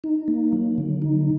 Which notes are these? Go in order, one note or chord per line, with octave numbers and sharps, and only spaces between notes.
D#4
A#3
F#3
D3
D#4